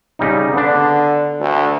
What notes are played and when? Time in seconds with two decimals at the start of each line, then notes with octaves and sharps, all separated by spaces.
0.19 C#3 G3 D#4
0.54 D3 B3 D4
1.40 D2